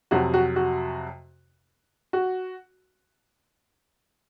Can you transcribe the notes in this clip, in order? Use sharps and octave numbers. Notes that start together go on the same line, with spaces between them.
F2 C3 F#3 F#4
F#4
F#4
F#4